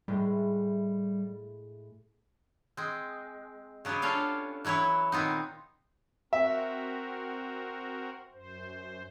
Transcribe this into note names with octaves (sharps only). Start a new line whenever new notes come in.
A2 G3 G#3 E4
G#3 C4
C#3 F#3 B3 G4 G#4
C#4 D4 F4 A4 C#5 F5
E3 F#3 E4 B4 C#5
A#2 D#3 B3 C4 D#4
C4 F#4 A#4 E5
F#2 C5